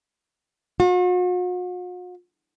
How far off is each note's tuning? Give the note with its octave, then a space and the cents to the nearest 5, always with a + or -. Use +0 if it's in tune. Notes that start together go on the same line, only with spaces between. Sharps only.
F#4 -45